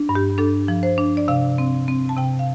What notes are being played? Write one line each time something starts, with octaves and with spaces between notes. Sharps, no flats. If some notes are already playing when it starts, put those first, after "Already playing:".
Already playing: D4
G2
G4
D4 A4
F3
C5
D4
D5
C3 F5
C4
C4
A5
C3 G5
F5